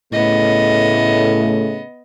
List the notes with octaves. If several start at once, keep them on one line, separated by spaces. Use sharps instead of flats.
A2 C#3 A3 B3 D#5